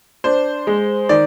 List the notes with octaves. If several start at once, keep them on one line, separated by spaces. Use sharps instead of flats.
D4 C5
G#3
D#3 D5